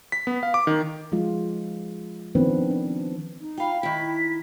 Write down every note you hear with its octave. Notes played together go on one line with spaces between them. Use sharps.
B6
B3
F5
D6
D#3
F3 G#3 F4
D#3 F3 B3 C4 D4 B4
D4
D#4
F4 F5 G5 B5
D#3 E4 B6